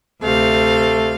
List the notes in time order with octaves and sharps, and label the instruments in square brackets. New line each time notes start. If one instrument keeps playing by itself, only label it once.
[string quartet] D2 C3 F5 [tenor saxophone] A3